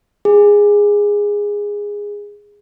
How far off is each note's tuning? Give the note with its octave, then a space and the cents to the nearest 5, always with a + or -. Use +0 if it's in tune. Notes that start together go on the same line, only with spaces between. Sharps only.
G#4 -15